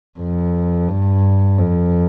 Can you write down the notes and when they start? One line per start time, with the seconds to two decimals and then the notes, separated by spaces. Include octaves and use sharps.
0.19 F2
0.88 G2
1.58 F2